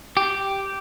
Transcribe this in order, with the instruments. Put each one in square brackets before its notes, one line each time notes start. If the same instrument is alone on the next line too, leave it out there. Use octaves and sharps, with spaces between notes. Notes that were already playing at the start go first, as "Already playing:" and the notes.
[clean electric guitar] G4